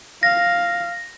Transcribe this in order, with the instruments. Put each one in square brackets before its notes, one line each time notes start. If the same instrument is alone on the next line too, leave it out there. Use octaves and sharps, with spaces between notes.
[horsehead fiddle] F5 [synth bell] A#6